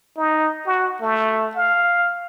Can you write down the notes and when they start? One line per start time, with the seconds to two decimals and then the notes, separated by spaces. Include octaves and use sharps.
0.17 D#4
0.66 F#4
1.01 A3
1.55 F5